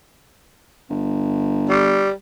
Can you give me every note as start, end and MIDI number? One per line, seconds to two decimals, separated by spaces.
0.90 2.08 31
1.69 2.12 55